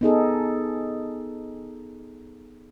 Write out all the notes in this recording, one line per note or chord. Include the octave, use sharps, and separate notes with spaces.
B3 D#4 G#4 A4